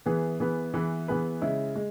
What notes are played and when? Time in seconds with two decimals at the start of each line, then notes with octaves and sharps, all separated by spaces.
0.06 E3 B3 G#4 B4
0.40 E3 B3 G#4 B4
0.74 E3 B3 G#4 B4
1.08 E3 B3 G#4 B4
1.41 C#3 G#3 E4
1.76 G#3